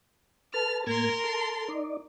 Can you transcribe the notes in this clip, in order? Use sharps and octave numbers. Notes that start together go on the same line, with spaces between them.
A4 B4 A5 F6
A2 A#3 A#4 C6 G#6
A4 A5
D#4 D5